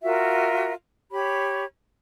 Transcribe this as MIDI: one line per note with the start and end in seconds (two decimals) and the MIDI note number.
0.03 0.73 65
0.03 0.73 66
0.03 0.73 70
0.03 0.73 76
1.11 1.65 67
1.11 1.65 73
1.11 1.65 83